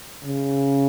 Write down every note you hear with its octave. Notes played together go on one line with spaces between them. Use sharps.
C#3